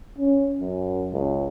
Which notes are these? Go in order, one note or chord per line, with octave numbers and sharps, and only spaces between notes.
C#4
F#2
C#2